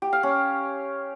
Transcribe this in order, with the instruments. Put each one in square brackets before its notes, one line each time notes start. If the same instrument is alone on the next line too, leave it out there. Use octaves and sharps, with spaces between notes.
[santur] G4
F5
C#4